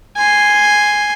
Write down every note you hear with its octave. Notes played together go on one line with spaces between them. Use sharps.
G#5 C6